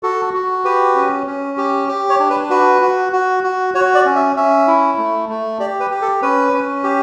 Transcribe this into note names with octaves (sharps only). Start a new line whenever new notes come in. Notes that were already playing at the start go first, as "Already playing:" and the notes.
F#4 A4
F#4
G4 B4
C#4
C#4
G4
G4
C#5
D4
B4
F#4 B4
F#4
F#4
F#4
F#4 C#5
D5
C#4
E5
C#4 E5
E4
A3
A3
G4 D5
B4
G4
A4
C#4 B4
C#4
G4